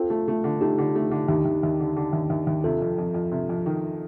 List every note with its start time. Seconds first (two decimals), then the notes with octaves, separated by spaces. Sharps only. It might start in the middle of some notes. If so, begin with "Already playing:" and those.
Already playing: C4 F4 A4
0.10 A3
0.28 A3
0.44 D3
0.61 A3 D#4 G4
0.78 D3
0.95 A3
1.11 D3
1.28 D#2 D#4 G4
1.45 D#2
1.63 D#2
1.80 D3
1.97 D3
2.13 D#2
2.30 D#2
2.47 D#2
2.64 C3 F4 A4
2.82 F2
2.98 F2
3.14 F2
3.32 C3
3.49 F2
3.66 D#3